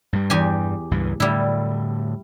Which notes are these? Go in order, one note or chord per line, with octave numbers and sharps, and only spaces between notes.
G2 G3
E2 G4 G#5
C#2 G2 E3
A2 D3 G3 E4